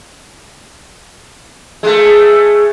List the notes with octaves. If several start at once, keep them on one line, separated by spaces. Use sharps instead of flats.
G#3 A3